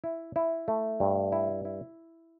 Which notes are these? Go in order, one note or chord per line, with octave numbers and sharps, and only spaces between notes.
E4
E4
A3
G2
E4
E4